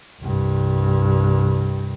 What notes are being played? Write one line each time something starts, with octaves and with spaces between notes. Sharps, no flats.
C2 G2